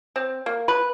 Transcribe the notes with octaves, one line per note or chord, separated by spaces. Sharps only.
C4
A#3
B4